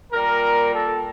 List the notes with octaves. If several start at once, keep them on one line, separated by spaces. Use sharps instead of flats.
A#2 G3 A#4
A4